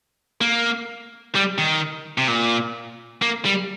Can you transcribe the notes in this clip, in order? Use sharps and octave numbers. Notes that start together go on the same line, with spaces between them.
A#3
G3
D#3
C3
A#2
A#3
G3